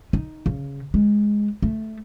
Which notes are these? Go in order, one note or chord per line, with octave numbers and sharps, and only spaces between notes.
D#4
C#3
G#3
A3